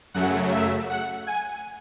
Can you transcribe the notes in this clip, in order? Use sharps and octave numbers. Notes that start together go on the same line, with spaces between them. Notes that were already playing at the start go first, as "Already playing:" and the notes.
F#2 C#3 F#3 A3 F#5
E5
F#5
G#5